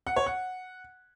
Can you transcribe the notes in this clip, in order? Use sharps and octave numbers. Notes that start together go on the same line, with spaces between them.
F#5
C#5
F#5